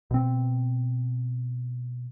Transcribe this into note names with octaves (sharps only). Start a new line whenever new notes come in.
B2 C4